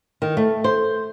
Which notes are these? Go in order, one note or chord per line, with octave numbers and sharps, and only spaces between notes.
D#3
A3
C5